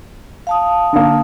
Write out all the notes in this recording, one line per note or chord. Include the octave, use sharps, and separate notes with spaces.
F5 A5 D#6
D3 A#3